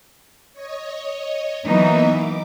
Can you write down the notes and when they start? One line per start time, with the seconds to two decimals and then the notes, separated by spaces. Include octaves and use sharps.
0.53 C#5 D#5
1.65 E3 F#3 A#3 B3 D#4 E5
2.11 D6